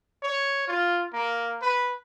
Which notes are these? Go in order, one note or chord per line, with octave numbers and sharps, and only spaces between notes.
C#5
F4
A#3
B4